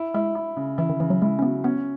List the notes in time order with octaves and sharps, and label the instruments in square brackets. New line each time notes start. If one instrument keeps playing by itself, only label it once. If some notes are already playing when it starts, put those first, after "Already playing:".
Already playing: [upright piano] E4
[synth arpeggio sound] G#3 [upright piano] E4
[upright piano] E4
C#3
[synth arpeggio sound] E3 [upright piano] E4
[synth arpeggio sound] D#3
[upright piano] C#3 [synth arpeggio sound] E3
[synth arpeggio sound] F#3
[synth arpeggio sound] G#3 [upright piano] E4
[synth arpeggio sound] C#4
[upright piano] F#3 [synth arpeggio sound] B3
[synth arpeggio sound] B3 [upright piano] C#4